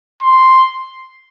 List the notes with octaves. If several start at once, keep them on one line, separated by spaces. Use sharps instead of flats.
C6